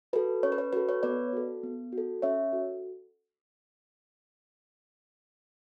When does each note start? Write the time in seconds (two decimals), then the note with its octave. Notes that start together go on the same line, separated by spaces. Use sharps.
0.13 F#4 A4 B4
0.43 C#4 C#5
0.52 B4
0.58 C#5
0.73 F#4 A4 B4
0.89 C#5
1.03 B3 B4 D5
1.33 F#4 A4
1.63 B3
1.92 F#4
1.98 A4
2.22 C#4 C#5 E5
2.53 F#4 A4